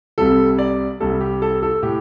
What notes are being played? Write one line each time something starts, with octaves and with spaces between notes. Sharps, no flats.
C2 C3 G3 A4
D5
C2 C3 G3 A4
G4
A4
A4
A2 G4